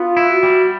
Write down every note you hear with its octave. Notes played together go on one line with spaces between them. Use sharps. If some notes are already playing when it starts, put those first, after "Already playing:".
Already playing: B3 F4
E4
F#4
G3